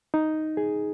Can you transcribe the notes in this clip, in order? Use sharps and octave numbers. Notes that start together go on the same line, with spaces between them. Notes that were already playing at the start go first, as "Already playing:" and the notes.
D#4
G#4